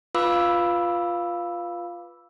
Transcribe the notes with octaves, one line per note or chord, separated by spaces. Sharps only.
F4 B4 F5 B5 D6 E6